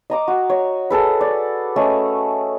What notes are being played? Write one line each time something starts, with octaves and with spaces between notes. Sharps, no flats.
D#5 A#5 D6
F#4
C#5
G#4 A4 B4
D5
A3 C#4 D#5